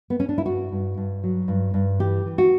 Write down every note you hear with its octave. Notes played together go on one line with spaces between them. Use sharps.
B3
C#4
D4
E4
G2 F#4
G2
G2
F#3
G2
G2
E3 G4
E3
F#4